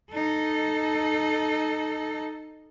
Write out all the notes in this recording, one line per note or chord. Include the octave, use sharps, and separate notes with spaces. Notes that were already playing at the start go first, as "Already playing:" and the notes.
D#4 A4